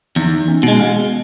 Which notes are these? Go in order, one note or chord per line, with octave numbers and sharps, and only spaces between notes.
E2 D#4
C#4
B2 G#3
B3